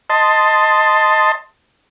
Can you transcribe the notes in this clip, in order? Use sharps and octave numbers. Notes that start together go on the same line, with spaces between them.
D#5 A5 C6